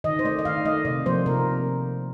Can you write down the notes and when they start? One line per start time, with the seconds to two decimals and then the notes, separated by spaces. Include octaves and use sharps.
0.04 D#3 D#5
0.19 C5
0.25 A3 D5
0.39 D#5
0.45 D#3 F5
0.65 A3 D#5
0.85 C3 D5
1.06 F3 A#3 C5
1.26 C3 A#4